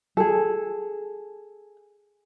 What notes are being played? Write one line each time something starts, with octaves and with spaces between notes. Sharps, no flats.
G#4 A4